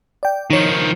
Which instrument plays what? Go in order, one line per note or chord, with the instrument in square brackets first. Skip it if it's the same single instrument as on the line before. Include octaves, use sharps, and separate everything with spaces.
[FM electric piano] D5 G5
[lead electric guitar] D#3 F3 [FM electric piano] D#4 C#5